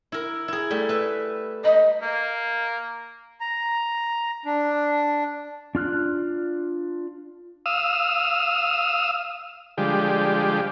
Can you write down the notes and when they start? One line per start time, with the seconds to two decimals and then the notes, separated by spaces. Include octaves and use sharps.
0.12 E4 A#4
0.48 E4 G#4
0.70 G3 A3
0.89 B4 E5
1.65 D#5 B5
2.02 A#3
3.40 A#5
4.45 D4
5.75 D4 F4 F6 F#6
7.66 F5 D#6 E6
9.78 D3 F3 G3 G#3 G4